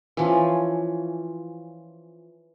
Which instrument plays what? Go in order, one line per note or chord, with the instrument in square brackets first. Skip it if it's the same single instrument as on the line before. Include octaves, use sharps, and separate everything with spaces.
[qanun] E3 F3 C#4